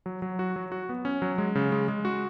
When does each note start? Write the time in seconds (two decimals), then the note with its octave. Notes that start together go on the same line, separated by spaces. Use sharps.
0.06 F#3
0.22 F#3
0.39 F#4
0.56 F#3
0.72 F#4
0.89 B3
1.05 C#4
1.22 F#3
1.38 G#3
1.55 C#3
1.72 G#3
1.88 G#3
2.05 F#4